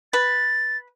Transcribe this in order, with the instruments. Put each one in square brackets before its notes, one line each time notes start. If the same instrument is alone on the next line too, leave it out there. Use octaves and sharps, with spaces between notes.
[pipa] B4 [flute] A6